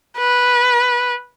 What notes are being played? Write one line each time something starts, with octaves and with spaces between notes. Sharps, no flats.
B4